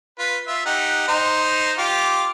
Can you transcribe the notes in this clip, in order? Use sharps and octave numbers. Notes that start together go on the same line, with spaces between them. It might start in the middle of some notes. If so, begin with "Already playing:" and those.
F4 B4
F4 E5
D#4 G4 F#5
D#4 C5
F4 G4 D6